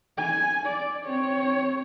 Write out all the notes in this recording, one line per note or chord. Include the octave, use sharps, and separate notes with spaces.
G#5
D5
C4 C#5